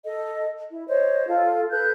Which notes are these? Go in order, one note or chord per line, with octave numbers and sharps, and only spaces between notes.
A4 D#5
E4
C5 C#5 D#5
F4 A4 F5
A4 B4 F#6 G6